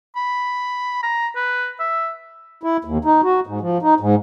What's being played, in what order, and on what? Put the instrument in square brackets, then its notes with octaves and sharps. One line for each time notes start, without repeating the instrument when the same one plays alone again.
[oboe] B5
A#5
B4
E5
[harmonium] E4
D#2
D#4
F#4
G#2
F3
D#4
G#2